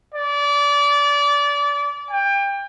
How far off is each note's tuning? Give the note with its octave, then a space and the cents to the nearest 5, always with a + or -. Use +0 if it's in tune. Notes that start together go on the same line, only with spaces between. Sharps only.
D5 -25
G5 +25